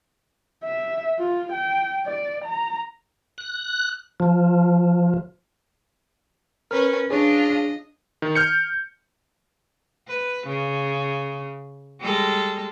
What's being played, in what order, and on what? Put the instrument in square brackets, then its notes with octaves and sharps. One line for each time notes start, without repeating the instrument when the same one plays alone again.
[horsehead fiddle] E5
F4
G5
D5
A#5
[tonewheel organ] F#6
F3
[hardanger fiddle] C#4 B4 [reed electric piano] A#4 F6
[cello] D4 F4 [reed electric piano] G#4 C#5 [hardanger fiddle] D#5
[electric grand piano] D#3
F6 G6 C#7
[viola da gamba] B4
C#3
G3 G#3 A4